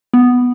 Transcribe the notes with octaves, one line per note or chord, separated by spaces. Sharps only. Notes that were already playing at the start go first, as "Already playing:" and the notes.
B3